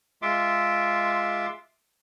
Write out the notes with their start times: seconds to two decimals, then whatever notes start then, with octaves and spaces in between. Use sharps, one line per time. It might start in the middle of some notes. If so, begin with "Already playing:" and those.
0.22 G#3 F4 E5 C6 D6